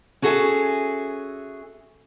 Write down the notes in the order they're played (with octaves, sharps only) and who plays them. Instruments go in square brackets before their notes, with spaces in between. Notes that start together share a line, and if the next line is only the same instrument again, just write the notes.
[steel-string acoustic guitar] C#4 F#4 G#4 A4 E5 G#5